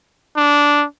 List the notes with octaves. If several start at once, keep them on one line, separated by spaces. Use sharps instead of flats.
D4